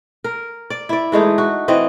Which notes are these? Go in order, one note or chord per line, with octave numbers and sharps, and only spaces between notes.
A#4
D5
E4 D5
E3 G#3 A3 D#4
F#4
E3 C4 D#5